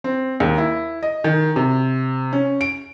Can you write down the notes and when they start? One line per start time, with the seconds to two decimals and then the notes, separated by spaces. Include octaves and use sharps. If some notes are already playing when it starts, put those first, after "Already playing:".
0.04 C4
0.40 D#2
0.58 E4
1.02 D#5
1.24 D#3
1.56 C3
2.33 C#4
2.61 D7